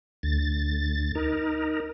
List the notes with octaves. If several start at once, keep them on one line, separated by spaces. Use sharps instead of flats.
D2 A6
D#4 A#4